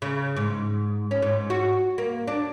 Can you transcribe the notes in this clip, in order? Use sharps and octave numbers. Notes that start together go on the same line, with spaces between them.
C#3
G#2
C#4
G#2
F#4
A#3
D4